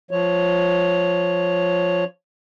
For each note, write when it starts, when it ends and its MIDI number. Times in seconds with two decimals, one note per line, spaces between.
0.11 2.04 53
0.11 2.04 73